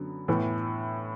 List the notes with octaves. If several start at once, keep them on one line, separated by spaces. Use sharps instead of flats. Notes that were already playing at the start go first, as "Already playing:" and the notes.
Already playing: F#2 D3 F#3 B3
A2 E3 B3 E4